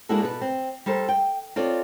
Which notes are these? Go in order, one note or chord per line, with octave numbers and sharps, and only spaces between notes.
G#3 A#3 D4 E4 F#4 A4
B2 A4 B4
C4
G3 A4 A#4 C5
G5
C4 F4 A4 C#5 D5